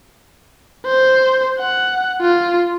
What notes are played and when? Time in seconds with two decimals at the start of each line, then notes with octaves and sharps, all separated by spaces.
0.86 C5
1.59 F#5
2.21 F4